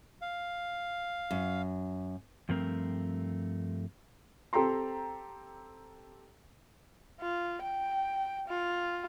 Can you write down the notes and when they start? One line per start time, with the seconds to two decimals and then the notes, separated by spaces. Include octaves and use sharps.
0.21 F5
1.31 F#2
2.49 G2 F3 A3 C4 A#4
4.53 C4 G4 A4 G5 A#5 C6
7.21 F4
7.62 G5
8.48 F4